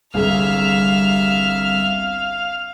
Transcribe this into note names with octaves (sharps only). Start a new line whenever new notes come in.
G1 C2 G#4 E5 F5 F6